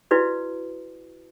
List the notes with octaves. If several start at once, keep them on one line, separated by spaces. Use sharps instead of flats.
E4 F#4 B4 D5